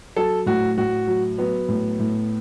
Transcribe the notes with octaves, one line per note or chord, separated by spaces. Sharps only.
F#3 A4
A2 F#4
A2 F#4
F#3
F#3 B3
A2
A2